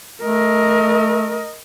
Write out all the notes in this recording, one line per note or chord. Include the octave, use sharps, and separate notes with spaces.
A3 A#4 D#5